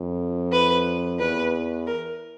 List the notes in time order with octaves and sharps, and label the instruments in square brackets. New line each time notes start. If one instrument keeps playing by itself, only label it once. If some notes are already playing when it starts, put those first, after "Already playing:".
Already playing: [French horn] F2
[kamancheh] B4
[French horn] E2 [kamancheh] B4
[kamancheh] A#4